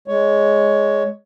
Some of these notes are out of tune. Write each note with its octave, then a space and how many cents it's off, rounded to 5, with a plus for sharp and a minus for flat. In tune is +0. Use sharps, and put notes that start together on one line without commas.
G#3 +5 C#5 +10